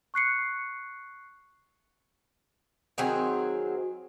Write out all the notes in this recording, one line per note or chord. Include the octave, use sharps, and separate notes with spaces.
C#6 F#6 C7 C#7
D#3 F#3 C4 G#4